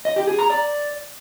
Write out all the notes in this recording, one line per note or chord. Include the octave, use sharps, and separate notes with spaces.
D#5
G4
G#4
A#5
D5